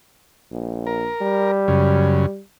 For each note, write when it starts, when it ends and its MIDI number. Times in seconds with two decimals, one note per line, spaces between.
0.51 1.08 34
0.87 1.52 70
1.22 2.41 55
1.68 2.26 42
1.68 2.26 49